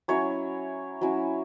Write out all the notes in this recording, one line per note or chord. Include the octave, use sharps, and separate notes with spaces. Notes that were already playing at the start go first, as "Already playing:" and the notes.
F#3 C#4 E4 C#5
F#3 C#4 E4